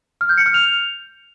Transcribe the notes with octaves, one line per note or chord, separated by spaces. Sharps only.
F6
G6
C#7
F6
F7